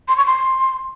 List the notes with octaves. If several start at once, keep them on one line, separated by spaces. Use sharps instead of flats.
C6
C#6
C6